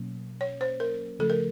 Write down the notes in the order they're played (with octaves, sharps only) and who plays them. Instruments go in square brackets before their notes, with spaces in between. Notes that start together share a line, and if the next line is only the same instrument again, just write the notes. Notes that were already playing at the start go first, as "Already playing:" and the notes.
Already playing: [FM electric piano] B2 F#3 A#3 C#4
[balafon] C#5
C5
A#4
[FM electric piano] C#3 F3 A3 [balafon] A4
[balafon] A#4